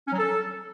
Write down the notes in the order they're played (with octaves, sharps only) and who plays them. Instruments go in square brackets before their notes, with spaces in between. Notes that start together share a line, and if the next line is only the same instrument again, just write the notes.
[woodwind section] C#4
F#3
A4